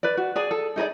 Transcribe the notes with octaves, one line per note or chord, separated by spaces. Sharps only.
B4 D5
F#4
G#4 D5 G#5
A4
D#4 G#4 A#4 D5